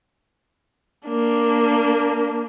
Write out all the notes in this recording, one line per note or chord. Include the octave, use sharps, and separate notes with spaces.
A#3 D4